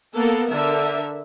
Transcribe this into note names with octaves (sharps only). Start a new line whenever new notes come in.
A#3 B3 A4
D3 A#4 E5